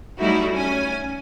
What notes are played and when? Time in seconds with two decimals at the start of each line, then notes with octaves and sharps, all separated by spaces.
0.19 F#3 G3 A3 D#4 E4 F#4
0.52 C#4 G#5